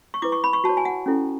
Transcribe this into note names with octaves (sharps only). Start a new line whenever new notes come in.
C#6
E4 B4 D6
C#6
B5
C#6
F#4 A5
C#5
G#5
F#5
C#4 E4 A4